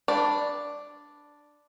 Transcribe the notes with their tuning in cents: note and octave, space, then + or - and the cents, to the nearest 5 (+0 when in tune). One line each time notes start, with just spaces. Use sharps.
D4 +0 D5 +0 B5 +0